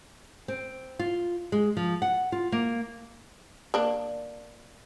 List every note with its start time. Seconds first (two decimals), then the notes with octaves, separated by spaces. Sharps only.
0.48 C4
0.99 F4
1.52 G#3
1.77 F3
2.02 F#5
2.32 F4
2.52 A#3
3.74 A#3 D4